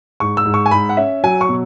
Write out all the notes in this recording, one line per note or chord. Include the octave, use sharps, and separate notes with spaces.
G#2 C#6
E6
G#2
C#6
G#5
G#2 B5
F#5
C#4 E5
F#3 G#5
C#6
B2